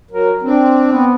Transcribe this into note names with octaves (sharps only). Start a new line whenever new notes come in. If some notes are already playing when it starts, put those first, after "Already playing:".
F#3 A#4
C4 D4
B3